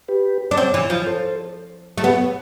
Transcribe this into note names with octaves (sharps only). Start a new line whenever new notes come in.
G4 B4
D4
C4
E3
F3
A4 C5
A3
B3 G4 B4